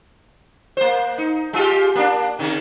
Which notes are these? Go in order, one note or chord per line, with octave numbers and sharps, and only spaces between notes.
A#3 C5
D#4
G#3 F4 G4
A#3 D4
C3 D#3